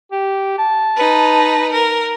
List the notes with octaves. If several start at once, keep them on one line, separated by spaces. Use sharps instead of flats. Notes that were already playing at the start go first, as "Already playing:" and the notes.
G4
A5
D#4 B4
A#4